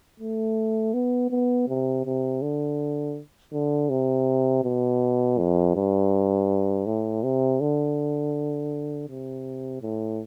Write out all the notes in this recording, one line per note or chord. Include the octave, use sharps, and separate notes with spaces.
A3
B3
B3
C3
C3
D3
D3
C3
B2
F2
G2
A2
C3
D3
C3
A2